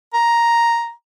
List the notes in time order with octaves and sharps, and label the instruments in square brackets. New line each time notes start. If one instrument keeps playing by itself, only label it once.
[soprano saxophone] A#5